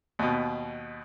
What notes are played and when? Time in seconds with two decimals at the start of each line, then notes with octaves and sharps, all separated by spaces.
0.19 D#2 B2